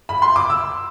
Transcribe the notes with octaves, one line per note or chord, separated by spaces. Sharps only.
B5
C6
D6
E6